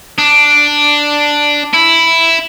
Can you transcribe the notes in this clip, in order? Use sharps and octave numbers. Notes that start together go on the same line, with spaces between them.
D4
E4